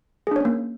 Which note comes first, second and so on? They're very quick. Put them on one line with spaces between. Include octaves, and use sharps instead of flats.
G#4 D4 C#5 C#4 A#3